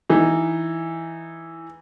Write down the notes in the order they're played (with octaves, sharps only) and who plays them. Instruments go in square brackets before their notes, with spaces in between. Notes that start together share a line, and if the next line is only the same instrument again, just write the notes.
[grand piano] E3 D#4